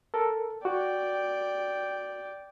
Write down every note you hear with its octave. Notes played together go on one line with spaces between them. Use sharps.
A4 A#4
F#4 D5 G5